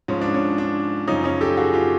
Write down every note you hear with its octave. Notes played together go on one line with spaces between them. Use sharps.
G#2 F3 C#4
D4
C#4
D4
F#2 C#3 F3 C#4 D#4
C#4 D#4
G4 A4
F#4 G#4
F4 G4